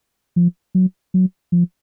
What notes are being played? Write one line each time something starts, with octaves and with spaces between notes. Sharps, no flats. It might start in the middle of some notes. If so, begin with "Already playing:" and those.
F3
F#3
F#3
F3